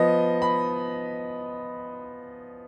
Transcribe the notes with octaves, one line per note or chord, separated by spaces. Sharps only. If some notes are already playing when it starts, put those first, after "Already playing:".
Already playing: F3 B3 D#5
B5